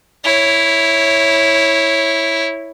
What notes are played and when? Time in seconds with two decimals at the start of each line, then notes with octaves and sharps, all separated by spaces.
0.24 E4 C#5